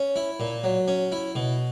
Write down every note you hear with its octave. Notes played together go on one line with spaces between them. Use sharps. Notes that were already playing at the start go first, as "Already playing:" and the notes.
Already playing: C#4
E4
A#2
F#3
C#4
E4
B2